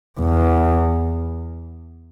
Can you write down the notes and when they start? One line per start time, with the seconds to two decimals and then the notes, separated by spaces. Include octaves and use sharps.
0.20 E2